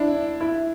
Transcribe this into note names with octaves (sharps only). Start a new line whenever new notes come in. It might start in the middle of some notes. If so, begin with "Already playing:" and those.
Already playing: D4 E4
E4